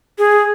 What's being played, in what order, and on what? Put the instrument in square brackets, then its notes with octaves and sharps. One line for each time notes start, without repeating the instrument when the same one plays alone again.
[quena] G#4